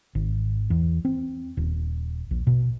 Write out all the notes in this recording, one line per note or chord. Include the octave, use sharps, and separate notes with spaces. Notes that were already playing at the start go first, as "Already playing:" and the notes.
G#1
E2
C4
D#1
A#1
B2